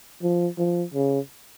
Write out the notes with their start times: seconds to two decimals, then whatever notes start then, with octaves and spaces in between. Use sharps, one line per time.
0.22 F3
0.58 F3
0.94 C#3